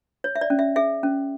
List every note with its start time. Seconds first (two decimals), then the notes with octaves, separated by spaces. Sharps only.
0.24 C#5
0.35 E5
0.41 D5
0.50 C#4
0.59 E5
0.76 G#4 E5
1.03 C#4